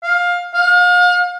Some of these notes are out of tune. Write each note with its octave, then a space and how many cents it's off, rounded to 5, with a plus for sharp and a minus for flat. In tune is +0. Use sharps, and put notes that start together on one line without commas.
F5 +15
F5 +40